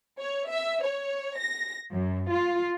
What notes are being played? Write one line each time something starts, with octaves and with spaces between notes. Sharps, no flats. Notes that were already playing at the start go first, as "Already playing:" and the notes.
C#5
E5
C#5
A#6
F#2
F4